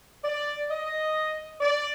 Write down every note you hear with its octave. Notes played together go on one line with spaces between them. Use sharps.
D5
D#5
D5